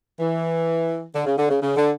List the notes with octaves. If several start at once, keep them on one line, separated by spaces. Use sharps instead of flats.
E3
D3
C#3
D3
C#3
C#3
D3